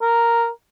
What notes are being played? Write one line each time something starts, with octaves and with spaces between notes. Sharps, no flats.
A#4